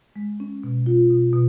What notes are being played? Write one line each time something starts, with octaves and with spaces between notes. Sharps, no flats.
G#3
C#4
B2
F4
B2
B2